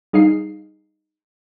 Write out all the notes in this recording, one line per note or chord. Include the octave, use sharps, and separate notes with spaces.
G3 D#4 G#4 F5 C7